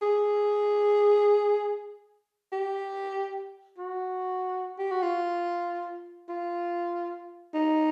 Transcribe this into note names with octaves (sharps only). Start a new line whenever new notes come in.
G#4
G4
F#4
G4
F#4
F4
F4
D#4